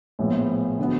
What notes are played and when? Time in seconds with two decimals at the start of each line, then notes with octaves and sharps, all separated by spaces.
0.19 A#1 A2 F3 G#3 B3
0.79 D3 F#3 B3